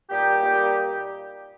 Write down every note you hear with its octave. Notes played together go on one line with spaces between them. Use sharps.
A#2 G3 A#3 D#4 G4
A#2 G3 A#3 D#4